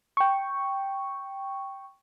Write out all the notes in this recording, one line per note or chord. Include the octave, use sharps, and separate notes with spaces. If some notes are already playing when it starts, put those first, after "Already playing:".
G5 C#6